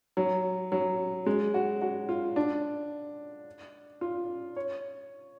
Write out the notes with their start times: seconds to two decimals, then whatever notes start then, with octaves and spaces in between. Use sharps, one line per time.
0.17 F#3
0.72 F#3
1.26 G#3
1.54 F#4
1.82 F#4
2.09 F4
2.36 D4
4.01 F4
4.56 C#5